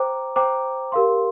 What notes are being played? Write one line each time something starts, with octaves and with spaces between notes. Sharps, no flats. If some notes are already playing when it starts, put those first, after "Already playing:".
Already playing: C5 G5 A#5 D6
C5 G5 A#5 D6
G4 A#4 F5 C6